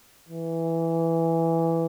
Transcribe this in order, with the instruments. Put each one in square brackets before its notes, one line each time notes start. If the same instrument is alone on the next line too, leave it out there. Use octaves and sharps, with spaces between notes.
[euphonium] E3